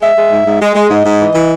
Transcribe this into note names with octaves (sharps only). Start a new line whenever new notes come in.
G#3 E5
G#3
G#2
G#2
G#3
G#3
G#2 D#5
G#2
E3
E3